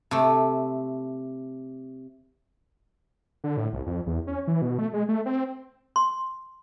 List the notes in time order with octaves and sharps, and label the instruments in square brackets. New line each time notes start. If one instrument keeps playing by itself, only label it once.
[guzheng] C3 A3
[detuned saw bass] D3
A2
C2
F2
E2
C#4
E3
B2
A3
G#3
A3
C4
[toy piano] C6